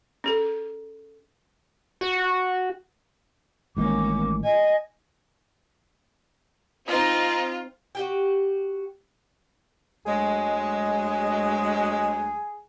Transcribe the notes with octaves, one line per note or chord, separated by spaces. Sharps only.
C#4 G#4 A4
F#4
A1 D#3 G#3 A#3 C#4 D6
D#5 G#5
C4 D#4 F4
F#4 G4 G5
D2 F#3 G#3 G#4